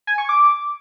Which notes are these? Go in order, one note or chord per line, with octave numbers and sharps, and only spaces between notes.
G#5
C#6
D6